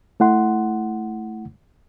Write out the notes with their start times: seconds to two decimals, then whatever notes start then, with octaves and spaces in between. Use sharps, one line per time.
0.20 A3 E4 F#5 C6